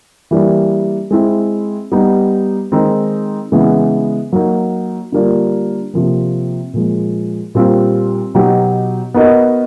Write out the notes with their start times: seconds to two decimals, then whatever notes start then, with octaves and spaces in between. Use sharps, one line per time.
0.31 E3 G3 A#3 D4
1.11 G#3 C4 E4
1.92 G3 B3 D#4
2.72 D#3 G#3 C4 D#4
3.52 C#3 E3 G#3 B3
4.33 F#3 A#3 D#4
5.12 D3 G3 A#3 D4 F4
5.94 C3 F3 A#3
6.74 A#2 F3 G#3
7.55 A#2 G3 C4 F4
8.34 B2 F#3 B3 D#4 G4
9.14 B3 D#4 F#4 A#4 D#5